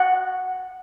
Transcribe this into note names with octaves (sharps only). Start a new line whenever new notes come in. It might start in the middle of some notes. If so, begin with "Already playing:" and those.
Already playing: F#5